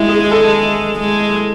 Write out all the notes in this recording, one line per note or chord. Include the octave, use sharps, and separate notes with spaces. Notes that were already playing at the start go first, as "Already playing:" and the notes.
Already playing: G#3 E4
G#4
A4
G#3